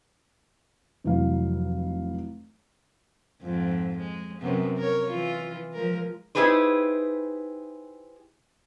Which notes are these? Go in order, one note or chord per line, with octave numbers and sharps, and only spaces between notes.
F1 E3 F#3 F5
F2 G#2
G#3
F#2 C3 B3
A#4 C#5
E3 F4
F3 G#3 A#4
D#4 E4 G4 G#4 B4 C5